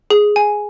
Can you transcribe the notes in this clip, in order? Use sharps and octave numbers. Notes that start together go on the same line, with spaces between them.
G#4
G#5